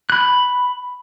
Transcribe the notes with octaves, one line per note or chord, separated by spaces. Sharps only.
B5 F#6